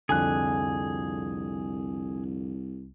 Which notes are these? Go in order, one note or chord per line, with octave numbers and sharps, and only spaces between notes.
C2 F2 D3 G#4 G#5 F#6